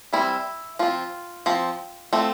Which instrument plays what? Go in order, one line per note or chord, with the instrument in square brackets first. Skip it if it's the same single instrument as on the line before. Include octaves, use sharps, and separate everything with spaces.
[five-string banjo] E3 G3 C4 E4
F3 C4 F4
F3 C4
F3 A3 C4